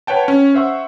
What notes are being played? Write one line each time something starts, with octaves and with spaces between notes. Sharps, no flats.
B4 C#5 F#5 G5 A5
C#4
C5 E5 F#5 C#6